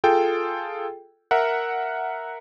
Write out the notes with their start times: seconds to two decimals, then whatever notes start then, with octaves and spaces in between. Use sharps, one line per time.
0.04 F4 G#4 A4 G5
1.31 A#4 E5 F#5